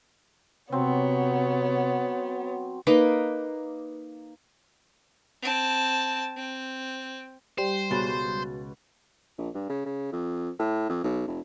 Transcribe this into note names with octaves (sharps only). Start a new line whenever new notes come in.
C3 F#3 B3 C4 C#5
A#3 D#4 B4 D6
C4 A5
C4
G3 C5 G5
C#2 B2 F#4 G#4 A6
A#1
G2
C#3
C#3
F2
A2
F2
B1
F1